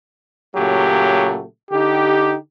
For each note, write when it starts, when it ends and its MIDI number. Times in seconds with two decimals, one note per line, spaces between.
0.55 1.43 46
0.55 1.43 49
0.55 1.43 54
0.55 1.43 57
0.55 1.43 67
1.70 2.35 50
1.70 2.35 63
1.70 2.35 67